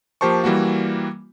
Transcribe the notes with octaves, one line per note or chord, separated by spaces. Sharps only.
F3 A#3 G4 C5 A5 C#6
E3 G3 A#3 F#4